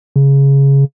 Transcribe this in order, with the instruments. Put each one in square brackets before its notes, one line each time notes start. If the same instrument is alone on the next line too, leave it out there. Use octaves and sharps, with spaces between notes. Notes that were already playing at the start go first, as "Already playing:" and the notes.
[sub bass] C#3